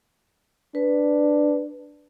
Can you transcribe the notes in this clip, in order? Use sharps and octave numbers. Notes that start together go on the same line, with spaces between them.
D4 B4